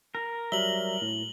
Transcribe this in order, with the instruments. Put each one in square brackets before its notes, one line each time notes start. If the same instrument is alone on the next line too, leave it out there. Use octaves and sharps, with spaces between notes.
[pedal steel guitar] A#4
[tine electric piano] F#3 G3 E5 [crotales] F#7 G7
[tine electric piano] A2